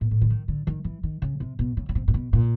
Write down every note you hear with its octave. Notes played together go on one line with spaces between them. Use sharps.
A#2
A2
D3
D#3
D3
D#3
E3
D#3
C#3
C3
B2
C#3
C#3
C3
A#2
B2
A#2